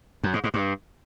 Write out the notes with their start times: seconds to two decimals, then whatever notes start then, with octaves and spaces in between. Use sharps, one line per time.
0.23 F#2
0.34 G#2
0.44 G#2
0.54 G2